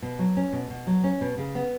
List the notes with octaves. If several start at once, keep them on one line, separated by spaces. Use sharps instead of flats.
B2
F#3
C#4
B2
B2
F#3
C#4
B2
C#3
B3